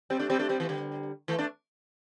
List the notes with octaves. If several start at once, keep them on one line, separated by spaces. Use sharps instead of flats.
G3 C4
A3 D4
G3 C4
A3 D4
G3 C4
E3 A3
D3 G3
E3 A3
A3 D4